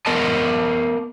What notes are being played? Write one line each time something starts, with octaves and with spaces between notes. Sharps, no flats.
B3 A#4 D#5 A5